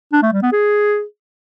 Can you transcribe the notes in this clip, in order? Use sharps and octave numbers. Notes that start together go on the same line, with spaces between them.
D4
A3
G3
B3
G#4